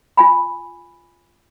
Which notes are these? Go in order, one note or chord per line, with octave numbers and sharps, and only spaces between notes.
F4 G#5 B5